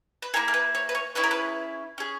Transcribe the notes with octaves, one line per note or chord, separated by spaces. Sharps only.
B4
A#3 E4 G#4 A#4
A#4
B4
C#5
B4
C#5
C#4 E4 G#4 B4
A#4
B4
C#4 G#4